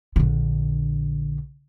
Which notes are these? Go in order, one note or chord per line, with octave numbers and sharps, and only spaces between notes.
A#1 D3